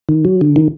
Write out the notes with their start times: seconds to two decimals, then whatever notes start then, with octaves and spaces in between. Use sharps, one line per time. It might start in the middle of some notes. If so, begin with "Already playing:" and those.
0.09 D#3
0.25 F#3
0.41 D3
0.56 D#3